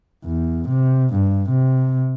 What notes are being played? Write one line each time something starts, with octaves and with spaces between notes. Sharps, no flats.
E2
C3
G2
C3